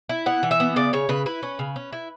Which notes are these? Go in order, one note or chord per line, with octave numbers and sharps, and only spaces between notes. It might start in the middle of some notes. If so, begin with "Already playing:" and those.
E4
B3 F#5
E3
E5
B3
C#3 D5
C#3 C#5
C#3 B4
E4 B4
C#4
C#3
C#4
E4